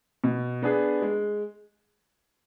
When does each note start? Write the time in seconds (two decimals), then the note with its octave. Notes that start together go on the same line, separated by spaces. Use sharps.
0.24 B2
0.63 B3 D4 G#4
1.02 G#3